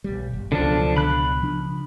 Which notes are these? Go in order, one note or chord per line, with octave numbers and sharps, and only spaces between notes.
B1 G3
G1
C#2 B2 D3 F3 F#3 D4
B5 F#6
C#3 F3 D4